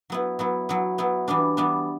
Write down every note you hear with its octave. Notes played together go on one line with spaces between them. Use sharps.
F#3 B3 E4
F#3 B3 E4
F#3 B3 E4
F#3 B3 E4
E3 G3 B3 D4
E3 G3 B3 D4